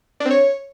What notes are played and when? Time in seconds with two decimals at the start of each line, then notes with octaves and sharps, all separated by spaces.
0.20 D4
0.25 C4
0.31 C#5